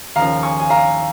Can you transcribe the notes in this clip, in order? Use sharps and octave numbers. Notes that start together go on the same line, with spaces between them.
D#2 C#3 F3 F5 A#5
G#5 C#6
G#5
F5 A#5